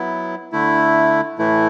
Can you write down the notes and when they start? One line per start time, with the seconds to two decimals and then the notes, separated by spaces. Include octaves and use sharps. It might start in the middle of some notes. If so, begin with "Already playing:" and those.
Already playing: F#3 B3 E4
0.52 D3 A3 E4
1.39 A2 E3 A3 E4